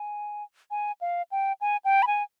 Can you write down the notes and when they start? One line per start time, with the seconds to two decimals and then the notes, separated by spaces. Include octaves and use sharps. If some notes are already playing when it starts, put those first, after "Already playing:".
Already playing: G#5
0.71 G#5
1.01 F5
1.31 G5
1.61 G#5
1.84 G5
2.02 B5
2.07 G#5